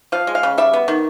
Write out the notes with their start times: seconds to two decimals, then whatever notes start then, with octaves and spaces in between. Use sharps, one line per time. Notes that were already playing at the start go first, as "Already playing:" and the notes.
0.12 F3 F5
0.27 G#3
0.35 F5
0.43 C#3
0.58 G3 E5
0.73 B3
0.88 D#3